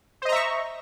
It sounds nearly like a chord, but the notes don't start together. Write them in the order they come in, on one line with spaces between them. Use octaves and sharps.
C5 D#5 A#5 E5 C#6